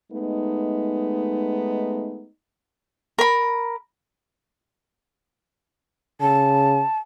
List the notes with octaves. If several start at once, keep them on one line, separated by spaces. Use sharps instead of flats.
G#3 A3 B3 D#4
A#4 B5
C#3 A5